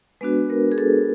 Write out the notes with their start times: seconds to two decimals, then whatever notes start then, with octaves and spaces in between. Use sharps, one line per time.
0.21 G#3 B3 D4 F#4 B4
0.50 A#4
0.72 G#4
0.78 A4